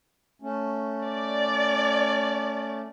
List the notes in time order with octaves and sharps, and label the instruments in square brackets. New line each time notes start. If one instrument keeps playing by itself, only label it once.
[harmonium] A3 C#4
[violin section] D5